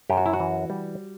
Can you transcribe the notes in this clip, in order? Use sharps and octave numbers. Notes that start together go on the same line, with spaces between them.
F#2 G4
F#4
E4
F#4
E3
G3